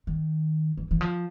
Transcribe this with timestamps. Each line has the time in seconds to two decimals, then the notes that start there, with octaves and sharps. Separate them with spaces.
0.07 D#3
0.77 E3
0.91 E3
1.01 F3